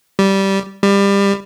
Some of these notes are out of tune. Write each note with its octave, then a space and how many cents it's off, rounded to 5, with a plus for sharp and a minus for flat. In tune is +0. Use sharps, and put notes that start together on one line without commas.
G3 -10
G3 +25